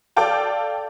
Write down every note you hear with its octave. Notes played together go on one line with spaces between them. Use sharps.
A4 D5 F5 G5 A5